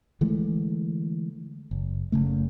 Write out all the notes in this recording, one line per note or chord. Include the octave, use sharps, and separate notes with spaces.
D3 E3 G#3 A3
F#1
F#1 C#3 A3